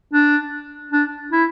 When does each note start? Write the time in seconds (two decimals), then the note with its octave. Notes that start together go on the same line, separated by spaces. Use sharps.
0.13 D4
0.92 D4
1.32 E4